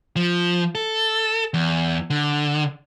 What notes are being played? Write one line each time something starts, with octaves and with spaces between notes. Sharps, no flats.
F3
A4
E2
D3